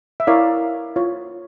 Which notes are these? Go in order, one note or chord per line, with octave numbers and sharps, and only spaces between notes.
E5
E4 A#4 C#5 D5 F5
F4 C#5